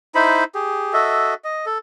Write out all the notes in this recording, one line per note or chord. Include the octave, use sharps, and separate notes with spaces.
D#4 E4 C5 B5
G4 G#4
F#4 A4 D#5 E5
D#5
A4